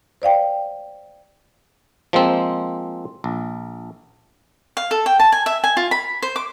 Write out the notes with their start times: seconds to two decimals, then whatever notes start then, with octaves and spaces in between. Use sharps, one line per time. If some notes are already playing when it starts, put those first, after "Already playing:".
0.22 C5 D5 F5 G5
2.13 F3 G#3 A#3 C4
3.24 A#1
4.77 F5
4.91 A4
5.06 G5
5.20 A5
5.32 G#5
5.46 E5
5.64 G#5
5.77 F4
5.91 B5
6.23 C5
6.36 D6